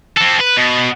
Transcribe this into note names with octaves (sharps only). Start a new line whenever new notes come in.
C4 A4
B4
B2